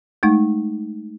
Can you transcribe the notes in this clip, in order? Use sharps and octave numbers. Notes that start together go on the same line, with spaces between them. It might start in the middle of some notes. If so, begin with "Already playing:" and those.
G#3 A3 D#4